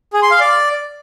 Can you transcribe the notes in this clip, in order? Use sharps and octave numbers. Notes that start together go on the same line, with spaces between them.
G#4
C6
F5
D5